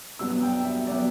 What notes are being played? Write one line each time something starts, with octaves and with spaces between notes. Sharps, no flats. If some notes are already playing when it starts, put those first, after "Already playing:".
G2 F#3 B3 E6
G5
E5
F#3 B3 D5